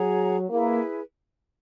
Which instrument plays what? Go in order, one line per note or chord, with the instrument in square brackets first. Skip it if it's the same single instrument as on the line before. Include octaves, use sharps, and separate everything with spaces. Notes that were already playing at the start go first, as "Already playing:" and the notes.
Already playing: [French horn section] F#3 [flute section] G#4 C#5 F#5 A#5
[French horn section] A#3 [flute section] E4 G#4 B4